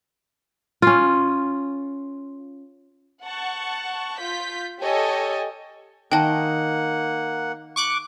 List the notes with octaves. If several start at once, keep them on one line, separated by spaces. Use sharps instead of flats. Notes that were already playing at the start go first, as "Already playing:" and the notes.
C#4 F4
F#5 A5 C#6
F4 G6 B6
G4 A4 C#5 D#5 G#5
D#3 A#3 D#5 F#5 G5 A5
C#6 D6 F#6